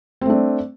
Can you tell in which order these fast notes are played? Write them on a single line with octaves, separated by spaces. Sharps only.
C4 A3 D4